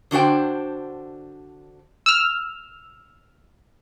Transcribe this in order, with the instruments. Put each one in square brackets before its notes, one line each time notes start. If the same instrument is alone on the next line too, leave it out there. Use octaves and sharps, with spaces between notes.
[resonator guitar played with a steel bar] D3 D4 F#4 C5 G5
[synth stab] E6 F6